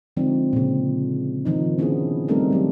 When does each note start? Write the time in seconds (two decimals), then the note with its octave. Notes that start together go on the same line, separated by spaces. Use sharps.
0.17 D3 F3 G#3 C4 D#4 D5
0.53 A#2 C#3
1.45 D#3 F3 D#4
1.78 B3 C#4 D4 E4 F#4 G#4
2.28 G3 A3 C4 D#4 A4 A#4
2.51 D#3 F#3 G4